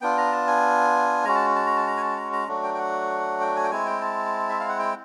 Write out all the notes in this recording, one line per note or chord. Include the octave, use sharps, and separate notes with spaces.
B3 D4 F4 G5
A#5
A5
G#5
G#3 C#4 F#4 A#5
A5
A5
A#5
A5
A#5
G#5
A5
A#5
A#5
F#3 A3 D4 F#4
G5
G5
F#5
G5
G#5
G5
G#3 C4 E4 G#5
G5
A5
E5
F5
F#5
G5